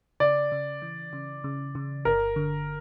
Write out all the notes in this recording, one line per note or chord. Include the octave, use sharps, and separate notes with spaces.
C#3 D5
C#3
E3
C#3
C#3
C#3
G1 A#4
D3